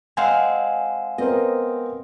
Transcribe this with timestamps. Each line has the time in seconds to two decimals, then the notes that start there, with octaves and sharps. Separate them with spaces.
0.17 G#3 C4 F5 F#5 G#5
1.18 B3 C4 A#4 D#5